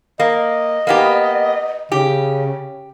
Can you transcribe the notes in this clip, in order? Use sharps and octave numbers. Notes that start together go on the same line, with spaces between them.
A#3 D#5
A#3 B3 G4
C#3 G4